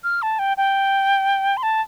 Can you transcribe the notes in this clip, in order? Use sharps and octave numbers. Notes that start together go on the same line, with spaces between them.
F6
A5
G5
G5
C6
A5